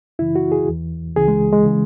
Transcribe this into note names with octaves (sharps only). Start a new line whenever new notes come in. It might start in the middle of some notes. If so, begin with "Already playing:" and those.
F#2 C#3 E3 E4
F#4
G#4
E2 E3
C#2 C#3 E3 G#4
G#3
G#3
C#3 E3